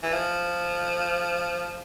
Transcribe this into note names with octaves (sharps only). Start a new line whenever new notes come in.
E3
F3